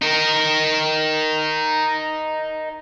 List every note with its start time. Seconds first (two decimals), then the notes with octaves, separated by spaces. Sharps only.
0.02 D#4 A#4